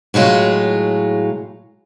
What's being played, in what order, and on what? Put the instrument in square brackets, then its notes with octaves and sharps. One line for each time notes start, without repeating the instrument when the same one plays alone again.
[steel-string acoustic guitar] A2 F#3 G#3 F4